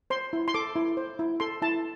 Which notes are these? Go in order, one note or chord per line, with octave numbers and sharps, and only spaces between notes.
C5 C6
E4
C6
A4 D6
E4
C5
E4
A4 C6
E4 A5